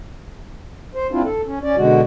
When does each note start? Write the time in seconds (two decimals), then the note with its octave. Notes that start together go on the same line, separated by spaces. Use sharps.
0.95 C5
1.12 C4 D4 E4 F4
1.25 A4
1.47 C#4
1.63 C#4 D5
1.77 B2 D3 G#3 F#4